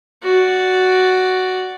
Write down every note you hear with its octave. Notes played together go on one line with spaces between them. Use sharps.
F#4 D5